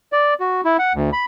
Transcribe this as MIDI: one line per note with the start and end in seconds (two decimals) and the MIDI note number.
0.13 0.34 74
0.40 0.61 66
0.65 0.77 64
0.79 0.93 78
0.95 1.10 38
1.13 1.25 83